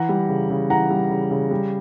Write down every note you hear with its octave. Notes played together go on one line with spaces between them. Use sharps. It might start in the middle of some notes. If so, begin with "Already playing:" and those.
Already playing: E3 F#5 A#5
G3
C#3
C#3
E3 F#5 A#5
G3
C#3
C#3
G3